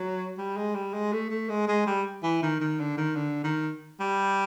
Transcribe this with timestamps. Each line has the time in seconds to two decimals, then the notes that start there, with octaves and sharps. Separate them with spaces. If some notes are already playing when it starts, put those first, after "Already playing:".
Already playing: F#3
0.38 G3
0.57 G#3
0.75 G3
0.94 G#3
1.13 A3
1.30 A3
1.49 G#3
1.68 G#3
1.87 G3
2.23 E3
2.43 D#3
2.61 D#3
2.80 D3
2.97 D#3
3.16 D3
3.44 D#3
4.00 G3